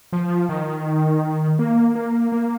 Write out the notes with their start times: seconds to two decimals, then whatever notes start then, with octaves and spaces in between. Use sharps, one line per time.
0.12 F3
0.49 D#3
1.59 A#3
1.95 A#3
2.32 A#3